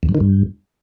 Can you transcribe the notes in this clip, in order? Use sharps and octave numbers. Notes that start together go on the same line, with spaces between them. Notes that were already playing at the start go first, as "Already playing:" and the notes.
E2
F#2
D#3
G2